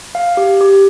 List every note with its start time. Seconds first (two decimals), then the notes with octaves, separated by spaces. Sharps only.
0.15 F5
0.37 G4
0.61 G4